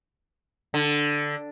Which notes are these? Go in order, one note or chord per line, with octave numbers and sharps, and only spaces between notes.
D3